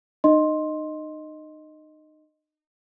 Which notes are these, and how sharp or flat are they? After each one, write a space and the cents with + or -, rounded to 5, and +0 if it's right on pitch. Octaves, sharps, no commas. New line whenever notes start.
D#4 -30 D#5 +0 C6 +10